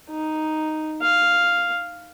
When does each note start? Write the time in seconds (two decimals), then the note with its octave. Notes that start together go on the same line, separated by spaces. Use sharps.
0.10 D#4
1.02 F5